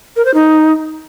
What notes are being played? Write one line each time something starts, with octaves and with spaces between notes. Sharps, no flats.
A#4
C5
D#4